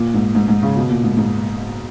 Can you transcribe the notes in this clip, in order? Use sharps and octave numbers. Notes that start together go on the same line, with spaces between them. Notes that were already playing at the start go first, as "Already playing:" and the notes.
Already playing: A#2
G#2
G#2
G#2
C#3
B2
A#2
G#2
G#2